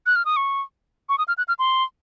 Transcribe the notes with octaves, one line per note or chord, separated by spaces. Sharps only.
F#6
F6
D#6
C#6
C#6
D#6
F6
F#6
F6
C6